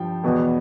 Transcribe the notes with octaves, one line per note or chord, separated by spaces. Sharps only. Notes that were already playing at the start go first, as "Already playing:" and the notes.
Already playing: G2 F3 G5
E2 B2 B3